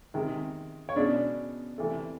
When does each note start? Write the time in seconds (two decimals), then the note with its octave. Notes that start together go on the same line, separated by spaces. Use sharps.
0.14 C3 D#3 G#3
0.89 C#5
0.96 B2 G#3 C#4 D4 D5
1.78 C3 E3 A3